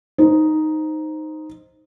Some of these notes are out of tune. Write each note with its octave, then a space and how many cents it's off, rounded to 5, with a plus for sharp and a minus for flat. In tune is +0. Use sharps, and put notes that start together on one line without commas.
D#4 +0 C5 +0